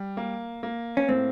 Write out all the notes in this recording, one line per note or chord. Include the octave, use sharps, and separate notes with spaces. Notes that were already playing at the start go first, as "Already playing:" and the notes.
Already playing: G3
A#3
A#3
C#4
A2 C4